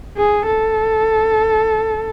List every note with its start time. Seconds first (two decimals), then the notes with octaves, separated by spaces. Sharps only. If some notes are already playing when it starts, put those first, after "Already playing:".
0.17 G#4
0.46 A4